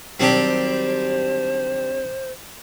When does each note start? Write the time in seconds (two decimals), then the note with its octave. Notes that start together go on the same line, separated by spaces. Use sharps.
0.20 D#3 F#3 G3 C4 D4 G4 C5